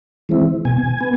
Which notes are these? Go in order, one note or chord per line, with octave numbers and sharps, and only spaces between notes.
E3 G#3 C4 E4
B2 G#5
B3